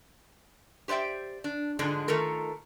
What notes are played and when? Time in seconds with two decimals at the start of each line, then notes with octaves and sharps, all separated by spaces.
0.88 G4 C5 D5 E5 G5
1.44 D4
1.79 G#2 D3 F3 G#3 D4
2.08 D#3 A3 F4 A4 A#4